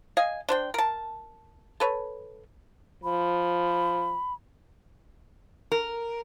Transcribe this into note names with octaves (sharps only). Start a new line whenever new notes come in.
D#5 F5 G#5
D4 C5 G5
A#4 A5
A4 B4 C#5
F3 B5
A#4